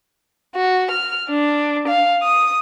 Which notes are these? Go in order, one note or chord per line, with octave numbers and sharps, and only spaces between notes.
F#4
F6
D4
F5
D#6